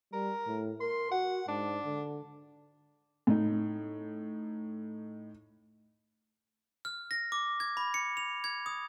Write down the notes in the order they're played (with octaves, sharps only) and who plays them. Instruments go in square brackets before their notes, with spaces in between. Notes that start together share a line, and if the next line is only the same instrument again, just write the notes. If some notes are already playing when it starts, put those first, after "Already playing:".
[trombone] G3 [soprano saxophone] A#4
[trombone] A2
[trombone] A#4 [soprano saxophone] C6
[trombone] F#4 [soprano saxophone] F#5
[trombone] G#2 [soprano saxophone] D4
[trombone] D3
[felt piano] A2 D#4
[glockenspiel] F6
A#6
D6
G#6
B5
C#7
F7
G#6
D#6